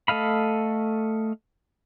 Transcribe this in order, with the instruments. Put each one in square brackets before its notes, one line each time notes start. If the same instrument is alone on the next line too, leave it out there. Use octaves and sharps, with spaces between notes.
[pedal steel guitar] A3 A4 D#5 F5 B5